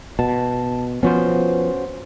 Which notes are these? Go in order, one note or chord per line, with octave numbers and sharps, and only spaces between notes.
B2 A5
F3 B3 C#4 F#4 C5